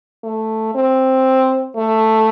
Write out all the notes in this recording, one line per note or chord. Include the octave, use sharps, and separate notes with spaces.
A3
C4
A3